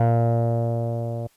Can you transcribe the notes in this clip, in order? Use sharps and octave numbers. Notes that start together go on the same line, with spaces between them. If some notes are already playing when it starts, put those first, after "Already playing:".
Already playing: A#2